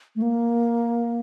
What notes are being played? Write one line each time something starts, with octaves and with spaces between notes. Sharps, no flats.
A3
A#3